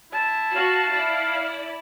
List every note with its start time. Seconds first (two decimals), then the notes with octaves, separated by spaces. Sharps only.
0.12 E4 A5
0.55 F#4 F5
0.92 E4 D5